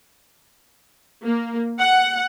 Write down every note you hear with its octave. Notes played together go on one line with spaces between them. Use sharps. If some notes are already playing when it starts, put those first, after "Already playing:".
A#3
F#5